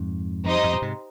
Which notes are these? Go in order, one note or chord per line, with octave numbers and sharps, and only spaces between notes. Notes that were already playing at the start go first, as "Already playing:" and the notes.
Already playing: F2 G#2
F2 D#4 G4 C5 D#5
G2
F2 G#2
G2 A#2
G#2 C3